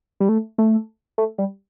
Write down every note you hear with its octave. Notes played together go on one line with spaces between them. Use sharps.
G3
A3
A3
A3
G3